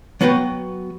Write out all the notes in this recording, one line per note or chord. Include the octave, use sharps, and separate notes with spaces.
F#3 B3 F#4 B4 G5